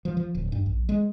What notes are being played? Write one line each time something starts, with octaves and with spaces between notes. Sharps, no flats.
F3
F3
D1
G2
A#1
G#3